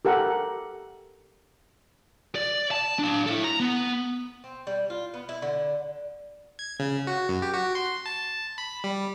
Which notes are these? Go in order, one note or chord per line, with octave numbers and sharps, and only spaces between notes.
G4 A4 A#4 F#5
D5
A5
D4 F5
E4 A4
A#5
B3
C4
G3
F4
B3
E4
D3
G#6
C#3
F#4
F#2
G4
F#4
C6
A5
B5
G3